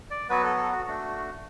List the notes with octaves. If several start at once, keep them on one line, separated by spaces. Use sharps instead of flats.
D5
F#3 B3 F#4 B4
A4
A4
F#4
A3 D4 F#4